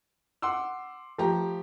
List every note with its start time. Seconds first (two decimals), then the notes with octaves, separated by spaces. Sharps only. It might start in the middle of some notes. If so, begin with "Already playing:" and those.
0.42 F#5 C6 D6 E6
1.18 F3 A3 G4 A#5